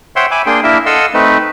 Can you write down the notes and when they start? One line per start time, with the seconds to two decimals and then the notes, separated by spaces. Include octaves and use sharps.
0.16 C5 C#5 E5 F#5 G5 C6
0.31 E5 G#5 B5 D6
0.46 A#3 D4 G#4 G5 C6
0.63 A#3 D4 E4 A#4 E5
0.86 A4 D#5 F5 F#5 C6 E6
1.14 A3 C4 D#4 B4